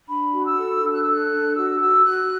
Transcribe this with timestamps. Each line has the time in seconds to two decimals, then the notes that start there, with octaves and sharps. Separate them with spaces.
0.09 D4 B5
0.33 F#4
0.46 E6
0.58 A4
0.82 D4
0.93 F#6
1.03 A4 E6
1.13 F#6
1.31 D4
1.56 F#4 E6
1.80 F#4 E6
2.05 F#4 F#6